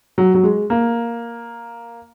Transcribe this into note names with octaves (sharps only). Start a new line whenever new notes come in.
F#3
F#3
G#3
A#3